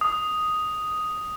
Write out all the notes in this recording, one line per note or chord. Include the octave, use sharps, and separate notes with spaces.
D#6